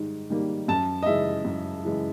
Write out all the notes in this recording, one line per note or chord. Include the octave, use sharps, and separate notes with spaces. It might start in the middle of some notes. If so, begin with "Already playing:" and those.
Already playing: G#2 D#3 G3
D#3 G3 A#3
F#2 A5
D#5
C#3 E3 G#3 E5
F#2
C#3 E3 G#3